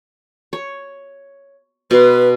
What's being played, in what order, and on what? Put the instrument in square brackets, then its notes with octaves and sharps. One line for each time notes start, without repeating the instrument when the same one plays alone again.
[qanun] C#5
[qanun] B2 C6 [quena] B4